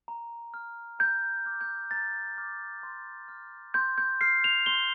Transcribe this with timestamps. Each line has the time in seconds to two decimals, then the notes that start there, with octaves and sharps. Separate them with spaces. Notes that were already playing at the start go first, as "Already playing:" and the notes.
0.08 A#5
0.54 F6
0.99 A#5 G6
1.46 D6 F6
1.61 G6
1.91 A#5 A6
2.38 D6 F6
2.83 C6
3.28 F6
3.74 C6 G6
3.98 G6
4.21 F6 C7
4.44 F7
4.66 C6 G7